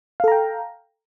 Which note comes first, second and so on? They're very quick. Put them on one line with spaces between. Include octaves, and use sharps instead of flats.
F5 A4 A#5 G5